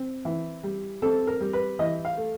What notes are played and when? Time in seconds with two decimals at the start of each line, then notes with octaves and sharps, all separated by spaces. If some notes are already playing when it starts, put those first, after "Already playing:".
Already playing: C4
0.25 E3
0.64 G3
1.02 C4 A4
1.27 A#4
1.41 G3
1.53 B4
1.79 E3 D#5
2.05 F5
2.17 A3